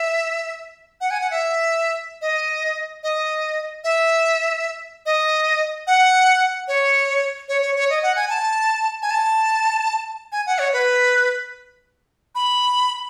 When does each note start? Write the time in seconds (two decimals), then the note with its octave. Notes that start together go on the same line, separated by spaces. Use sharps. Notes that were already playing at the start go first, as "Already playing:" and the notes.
Already playing: E5
1.01 F#5
1.11 G#5
1.21 F#5
1.31 E5
2.22 D#5
3.03 D#5
3.84 E5
5.06 D#5
5.87 F#5
6.68 C#5
7.48 C#5
7.62 C#5
7.76 C#5
7.90 D#5
8.03 F#5
8.16 G#5
8.30 A5
9.02 G#5
9.10 A5
10.32 G#5
10.46 F#5
10.59 C#5
10.73 B4
12.35 B5